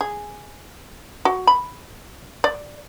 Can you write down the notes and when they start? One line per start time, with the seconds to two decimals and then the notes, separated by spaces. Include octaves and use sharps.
0.01 G#4
1.25 F#4
1.47 B5
2.44 D5